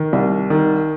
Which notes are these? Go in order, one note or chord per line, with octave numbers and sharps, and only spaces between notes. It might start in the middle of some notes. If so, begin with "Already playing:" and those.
Already playing: D#3
C2
D#3